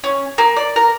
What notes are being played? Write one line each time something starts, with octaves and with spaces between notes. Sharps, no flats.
C#4
A#3
D5
A#4